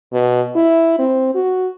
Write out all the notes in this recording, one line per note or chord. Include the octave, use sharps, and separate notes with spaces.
B2
E4
C4
F#4